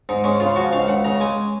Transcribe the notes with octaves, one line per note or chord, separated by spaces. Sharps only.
G#2 D#4
G#3 C#4
C#3 F4
F3 F#4
C#2 F5
C#2 F#5
C#3 A#5
G#3 G#5